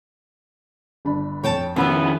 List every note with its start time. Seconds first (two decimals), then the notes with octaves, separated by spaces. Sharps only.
1.05 G1 D4 B5
1.44 F2 C#5 G5 A5
1.76 D#3 F3 B3 C#4 E4 E5